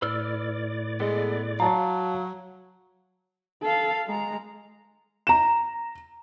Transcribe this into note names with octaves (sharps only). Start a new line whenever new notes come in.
A2 B4 D5 E6 F6
G#3 B3 A4 D#5
F#3 F5 A5 A#5
A4 F5
G#3 A#5
A#5 E7